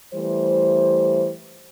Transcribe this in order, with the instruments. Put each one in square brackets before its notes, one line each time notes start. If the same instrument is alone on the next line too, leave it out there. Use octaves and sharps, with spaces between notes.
[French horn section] E3 G3 A3 C5